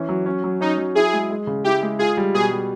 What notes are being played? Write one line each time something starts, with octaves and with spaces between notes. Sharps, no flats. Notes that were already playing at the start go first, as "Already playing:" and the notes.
Already playing: E3 C#4
F#3
C#4
F#3
C#4 D#4
F#3
E4 G#4
G#3
G#3
C#3
E4 G4
G#3
F4 G#4
G3
B2 G#4
G3